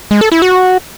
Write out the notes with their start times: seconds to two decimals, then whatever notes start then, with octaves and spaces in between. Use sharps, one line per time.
0.11 G#3
0.21 A4
0.32 E4
0.42 F#4